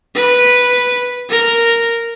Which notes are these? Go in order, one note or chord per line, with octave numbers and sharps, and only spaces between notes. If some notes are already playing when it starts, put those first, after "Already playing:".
B4
A#4